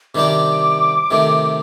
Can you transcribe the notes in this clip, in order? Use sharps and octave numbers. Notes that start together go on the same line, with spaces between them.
C3 D#3 G3 D4 G4 D6
C3 D#3 A3